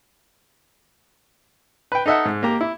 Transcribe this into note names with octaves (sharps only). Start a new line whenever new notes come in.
B4 G5
D#4 A4 D#5 E5 F#5
G#2
A#3 G4 A#5 D6
E4